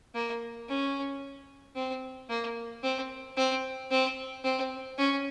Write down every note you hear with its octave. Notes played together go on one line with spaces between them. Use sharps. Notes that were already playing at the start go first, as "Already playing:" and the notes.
A#3
C#4
C4
A#3
C4
C4
C4
C4
C#4